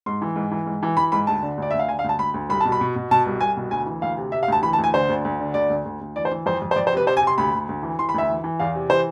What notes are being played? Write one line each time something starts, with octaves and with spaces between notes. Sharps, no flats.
G#2 C6
E3
G#2
E3
G#2
E3
E3 B5
G#2 B5
D2 A5
D3
D2 D5
D2 E5
F5
D3 G#5
F5
D2 A5
D2 B5
D2
C2 B5
B2 A5
B5
B2
B2
B2 A5
C2
C2 G#5
B2
D2 G#5
E3
D2 F5
C3
C3 E5
F5
D2 A5
E3 B5
A5
D2
G#5
D3 C5
D2
D2
D3
D2 D5
D2
D2
D2
E3 D5
C5
E3
F2 C5
F2
C5
F2 D5
C5
C3 B4
C3 C5
G#5
C3
C6
D2 B5
D2
D2
E3
E3 C6
B5
D2 E5
E3
E3
E2 F5
C3
E3 C5